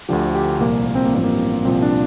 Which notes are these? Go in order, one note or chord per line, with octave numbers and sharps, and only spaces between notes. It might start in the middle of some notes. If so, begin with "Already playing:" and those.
D2 D3 F3 G4
G4
C2 A#2 F3 A#3
A#3
C4
A#3
A1 G2 F3 C4
A#3
C2 A#2 F3 C4
D4